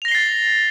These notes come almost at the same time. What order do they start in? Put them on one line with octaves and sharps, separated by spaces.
F7 A#6 G7 C7 A6